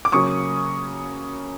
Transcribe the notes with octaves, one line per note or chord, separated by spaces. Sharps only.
D6
C#3 F#3 A#3 C#4 C#6 D#6